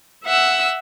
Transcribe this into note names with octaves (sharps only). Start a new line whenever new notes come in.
E5 F#5 E6